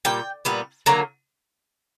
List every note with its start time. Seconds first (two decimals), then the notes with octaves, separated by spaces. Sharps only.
0.05 A#2 G3 G5
0.45 A#2 G3 B3
0.86 D3 F#3 A#3 A#5